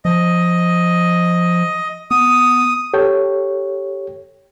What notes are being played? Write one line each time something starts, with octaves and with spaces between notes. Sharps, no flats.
F3 D#5
B3 D#6
G4 A4 C#5 G5